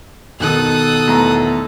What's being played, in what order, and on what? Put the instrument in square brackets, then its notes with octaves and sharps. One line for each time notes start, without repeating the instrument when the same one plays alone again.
[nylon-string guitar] B2 D#3 [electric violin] A4 [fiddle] D#6 F#6
[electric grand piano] E2 A3 A#5